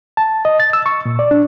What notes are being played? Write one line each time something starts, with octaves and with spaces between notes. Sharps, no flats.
A5
D#5
A6
E6
C#6
A#2
D5
D4